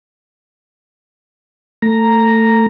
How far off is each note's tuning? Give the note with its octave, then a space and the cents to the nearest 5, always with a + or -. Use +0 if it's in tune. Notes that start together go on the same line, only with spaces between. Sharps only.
A3 +20 A#5 +0